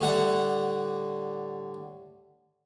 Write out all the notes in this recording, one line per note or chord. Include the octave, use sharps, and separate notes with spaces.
A2 D3 G3 F#5